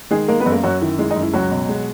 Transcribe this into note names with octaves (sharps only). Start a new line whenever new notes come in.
D#3 G#3 G#4
G#3 A#3 A#4
B3 B4
F#2
A#3 A#4
F#2 F#3 F#4
D#3 E4
G#3 E4
D#4
F#2
E4
C#2 F#3 F#4
B2
G#3